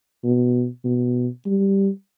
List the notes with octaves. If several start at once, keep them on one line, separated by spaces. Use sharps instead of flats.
B2
B2
G3